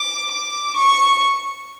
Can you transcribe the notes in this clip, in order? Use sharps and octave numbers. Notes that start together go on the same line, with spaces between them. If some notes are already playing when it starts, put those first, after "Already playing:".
Already playing: D6
D6
C#6